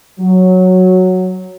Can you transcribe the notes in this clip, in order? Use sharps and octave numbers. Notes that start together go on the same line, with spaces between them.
F#3